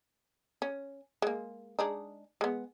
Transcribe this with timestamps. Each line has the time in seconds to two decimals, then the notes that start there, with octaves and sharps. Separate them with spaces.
0.62 C#4
1.22 G#3 A#3
1.79 G#3 D4 D#4
2.41 G#3 B3